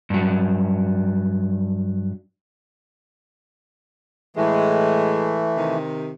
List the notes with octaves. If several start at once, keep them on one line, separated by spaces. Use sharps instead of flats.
G2 F#3
A2 E3 G#3 A3
C3 D#3